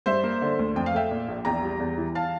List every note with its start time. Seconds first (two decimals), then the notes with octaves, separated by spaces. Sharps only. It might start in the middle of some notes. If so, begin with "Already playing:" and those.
0.06 G2 C5 E5
0.24 A#3
0.42 D3
0.59 D2
0.76 F2 G5
0.86 F5
0.94 A3 E5 G5
1.11 A#2
1.28 A#1
1.45 E2 G5 A#5
1.63 G3
1.80 E2
1.98 E3
2.15 F5 A5